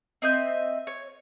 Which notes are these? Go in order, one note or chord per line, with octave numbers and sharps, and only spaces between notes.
C4 D#5 E5 G6
C#5